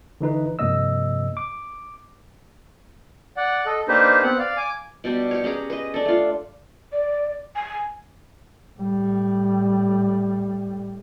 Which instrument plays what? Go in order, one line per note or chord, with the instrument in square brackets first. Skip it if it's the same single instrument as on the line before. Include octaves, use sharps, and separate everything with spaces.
[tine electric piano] D3 E3 D#4 B4
G2 C3 F3 A#3 D#5 E6
D6
[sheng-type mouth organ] D5 F#5
A4 D#5
A#3 D4 D#4 G4 B4 C5
B3 C4 F#5
D5 F5
G#5 D6
[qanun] B2 G3 D4 G4
G4 C#5
C#4 G4 G#4 A#5
B4 D#5
D4 A4
A3 F4
[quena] D5
G#5
[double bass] A2 G3